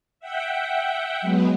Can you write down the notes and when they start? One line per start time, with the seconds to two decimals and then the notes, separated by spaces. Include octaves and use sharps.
0.20 E5 F#5 G5
1.21 F#3 G#3 B3